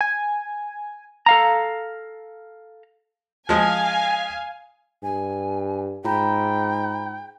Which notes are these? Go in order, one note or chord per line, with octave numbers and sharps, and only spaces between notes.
G#5
A4 F5 A#5
F3 G#3 F5 G#5
G2 G#5
G#2 F4 G5 A#5 B5